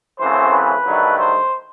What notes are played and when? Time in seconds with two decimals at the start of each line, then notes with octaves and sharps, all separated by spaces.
0.19 F#2 C#3 E3 A3 C4 C5
0.53 B4
0.85 G2 D#3 F#3 A3
1.19 C5